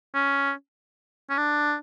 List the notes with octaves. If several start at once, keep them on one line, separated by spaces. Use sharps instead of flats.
C#4
C#4
D4